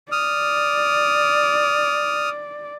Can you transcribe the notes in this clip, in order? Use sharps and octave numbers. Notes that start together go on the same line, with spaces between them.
D5 D#6 F6